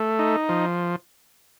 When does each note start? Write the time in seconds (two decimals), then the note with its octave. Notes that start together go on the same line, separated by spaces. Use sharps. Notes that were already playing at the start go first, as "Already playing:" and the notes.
Already playing: A3
0.19 D#4
0.49 F3